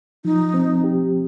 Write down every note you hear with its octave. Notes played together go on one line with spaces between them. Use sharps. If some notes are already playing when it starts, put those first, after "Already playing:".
F3 D#4
C4
G4